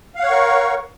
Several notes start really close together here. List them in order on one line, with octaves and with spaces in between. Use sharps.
F5 F#5 C#5 C#6 A#4